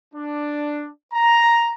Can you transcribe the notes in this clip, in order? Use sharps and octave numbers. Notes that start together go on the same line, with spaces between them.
D4
A#5